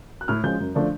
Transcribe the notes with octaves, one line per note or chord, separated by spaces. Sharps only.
F#6
A2 F6
F3 G#3 C#4 G6
F#2
D3 F3 A3 D4